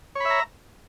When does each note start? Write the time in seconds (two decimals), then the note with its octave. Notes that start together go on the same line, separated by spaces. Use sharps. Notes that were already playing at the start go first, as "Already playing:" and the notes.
0.15 C#5
0.20 B5
0.25 E5
0.30 A#5